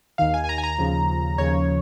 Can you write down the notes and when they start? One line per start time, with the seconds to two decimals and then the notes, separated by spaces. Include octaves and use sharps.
0.18 D#2 D#3 F5
0.34 G#5
0.44 G#5
0.49 A#5
0.58 G#5
0.64 A#5
0.79 D#2 C#3 F3
1.38 D#2 C#3 F3 C#5